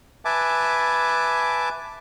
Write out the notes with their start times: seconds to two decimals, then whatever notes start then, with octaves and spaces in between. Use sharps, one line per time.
0.25 B4 E5 G#5 A5 D6